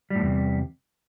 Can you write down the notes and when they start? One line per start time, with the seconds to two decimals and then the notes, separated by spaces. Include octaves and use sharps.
0.10 G3
0.15 A2
0.20 E2
0.25 C3